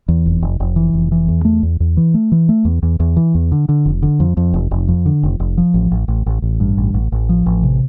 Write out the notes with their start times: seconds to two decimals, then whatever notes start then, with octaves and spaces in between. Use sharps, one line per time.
0.08 E2
0.26 F1
0.42 F1
0.60 F1
0.76 E3
0.93 F1
1.12 E3
1.28 E2
1.45 A3
1.63 E2
1.80 E2
1.97 E3
2.14 A3
2.32 E3
2.49 A3
2.65 E2
2.83 E2
3.00 E2
3.17 E3
3.35 E2
3.52 D3
3.69 D3
3.85 F1
4.03 D3
4.20 F2
4.37 F2
4.54 F1
4.71 F1
4.88 F2
5.06 D3
5.23 F1
5.40 F1
5.58 F3
5.74 A1
5.91 A1
6.08 A1
6.26 A1
6.42 A1
6.60 G2
6.77 A1
6.94 A1
7.12 A1
7.29 F3
7.46 A1
7.63 C3